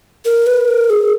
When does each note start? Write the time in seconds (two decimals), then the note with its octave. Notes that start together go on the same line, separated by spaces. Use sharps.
0.25 A#4
0.47 B4
0.68 A#4
0.90 G#4